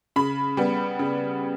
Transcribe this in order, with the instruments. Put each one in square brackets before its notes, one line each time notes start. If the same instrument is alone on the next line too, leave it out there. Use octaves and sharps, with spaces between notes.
[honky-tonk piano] C#3 B5
G3 B3
C#3